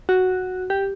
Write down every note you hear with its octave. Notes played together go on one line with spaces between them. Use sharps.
F#4
G4